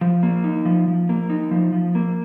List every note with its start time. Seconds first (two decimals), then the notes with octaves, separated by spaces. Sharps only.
0.01 F3
0.23 A#3
0.44 D#4
0.65 F3
0.88 F3
1.09 A#3
1.30 D#4
1.51 F3
1.73 F3
1.95 A#3